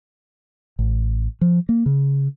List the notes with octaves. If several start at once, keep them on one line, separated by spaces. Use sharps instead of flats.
A1
F3
A#3
C#3